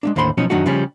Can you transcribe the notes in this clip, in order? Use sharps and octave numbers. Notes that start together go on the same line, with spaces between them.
G#3 A#3 D4
D#2 A2 D3 C5 B5 C6
B2 F3 F#3 C#4 D#4
F#2 D#3 F#3 D4 D#4 F#4
C#3 F3 G3 C#4